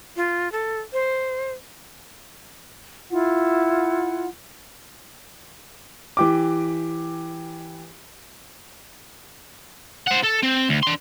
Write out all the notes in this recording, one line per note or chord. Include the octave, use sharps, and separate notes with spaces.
F4
A4
C5
E4 F4 F#5
E3 G4 D6
C5 F#5
A4
C4
D2
D4 C6